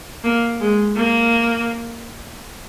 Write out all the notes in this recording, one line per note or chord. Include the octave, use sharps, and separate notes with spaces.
A#3
G#3
A#3